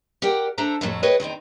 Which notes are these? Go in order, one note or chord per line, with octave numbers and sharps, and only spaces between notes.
G4 A#4 D5 F#5 G5
D4 A4 C5 E5 A#5
F2 A2 F#3 A3
G#4 B4 C#5 D#5 G5
E2 D#3 C4 D#4